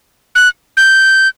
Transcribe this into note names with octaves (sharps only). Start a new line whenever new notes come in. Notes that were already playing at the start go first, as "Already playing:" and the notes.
F#6
G6